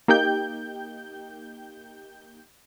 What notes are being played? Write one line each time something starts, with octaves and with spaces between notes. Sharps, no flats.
A#3 D#4 G4 G5 G6